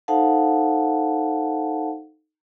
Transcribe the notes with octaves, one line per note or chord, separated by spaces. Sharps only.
D#4 A4 C5 F5 F#5 A5